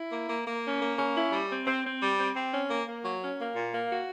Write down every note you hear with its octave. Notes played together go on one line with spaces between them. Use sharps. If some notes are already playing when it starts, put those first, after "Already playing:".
Already playing: E4
A#3
A#3
A#3
C#4
A#3
C#4
E4
G3
C4
C4
C4
G3
C4
C4
C#4
A#3
A#3
F#3
C#4
A#3
A#2
A#3
F#4